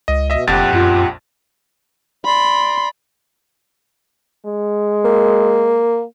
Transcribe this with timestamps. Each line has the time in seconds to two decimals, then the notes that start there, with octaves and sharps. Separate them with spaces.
0.08 C#2 D#5
0.30 B2 D#5 E5
0.47 F1 A#1 F2 G4 F#5 A6
0.72 F#2 F4
2.25 D5 B5 C6
4.46 G#3
5.05 A#3